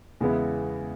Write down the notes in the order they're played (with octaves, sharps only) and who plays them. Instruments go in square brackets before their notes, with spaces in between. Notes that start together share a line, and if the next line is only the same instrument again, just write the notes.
[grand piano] E2 C#3 G#3 B3 E4